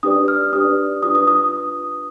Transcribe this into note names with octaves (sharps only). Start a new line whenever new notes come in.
D4 G4 B4 D5 D#6
F6
D4 G4 B4 D5 D#6
D4 F4 B4 D#6
D#6
D#6